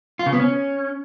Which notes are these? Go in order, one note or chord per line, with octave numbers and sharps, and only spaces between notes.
F4
C#3
B3
C#4